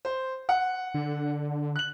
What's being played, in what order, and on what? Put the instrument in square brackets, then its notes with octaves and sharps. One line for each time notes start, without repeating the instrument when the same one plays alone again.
[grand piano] C5
F#5
[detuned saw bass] D3
[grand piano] F#6 F#7